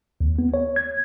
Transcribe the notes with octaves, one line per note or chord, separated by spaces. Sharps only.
D#2
B3
C#5
G#6